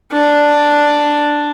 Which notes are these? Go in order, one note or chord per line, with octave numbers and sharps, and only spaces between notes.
D4